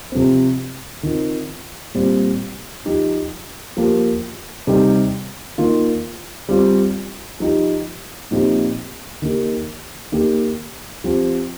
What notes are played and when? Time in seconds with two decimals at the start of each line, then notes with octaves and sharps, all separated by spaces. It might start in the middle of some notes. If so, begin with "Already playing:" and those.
0.12 C3 F3 C4
1.03 D#3 C4 F4
1.94 A#2 G3 C4
2.85 F3 D#4 G4
3.77 F3 A#3 G4
4.67 C3 G3 D#4 G4
5.58 D#3 A#3 F4
6.49 G3 C4 F4
7.40 F3 D#4 G4
8.31 A#2 F3 C4 D#4 G4
9.22 D#3 A#3 D#4 G4
10.12 D#3 A#3 G4
11.04 F3 C4 G4